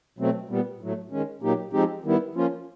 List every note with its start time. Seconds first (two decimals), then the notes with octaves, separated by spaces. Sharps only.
0.19 B2 F#3 A3 C4
0.49 A#2 G3 B3
0.81 A2 F#3 A3
1.11 D#3 G#3 C#4
1.42 A#2 F#3 A#3 D#4 G4
1.73 F3 G#3 C4 D#4 G4
2.04 D#3 G3 B3 E4
2.35 F3 A#3 C#4 F4